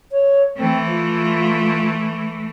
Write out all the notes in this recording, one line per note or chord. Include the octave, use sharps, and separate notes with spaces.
C#5
E3 A3 C4
F4